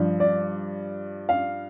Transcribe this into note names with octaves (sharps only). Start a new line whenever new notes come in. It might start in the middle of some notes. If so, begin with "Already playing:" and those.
Already playing: G2 F3
D5
F5